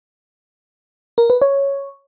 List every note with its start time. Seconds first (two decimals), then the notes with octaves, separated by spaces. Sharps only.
1.18 A#4
1.30 B4
1.42 C#5